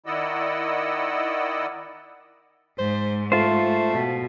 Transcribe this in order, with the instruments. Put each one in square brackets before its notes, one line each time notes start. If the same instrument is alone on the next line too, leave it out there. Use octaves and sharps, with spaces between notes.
[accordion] D#3 E4 D5 D#5 F#5 E6
[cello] G#2 [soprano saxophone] C5
[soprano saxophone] A3 [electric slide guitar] F4 C5
[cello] B2